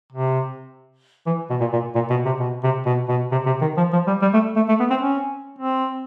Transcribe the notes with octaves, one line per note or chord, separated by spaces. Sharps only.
C3
E3
B2
A#2
A#2
A#2
B2
C3
B2
C3
B2
B2
C3
C3
D#3
F3
F3
G3
G3
A3
A3
A3
B3
C4
C#4
C4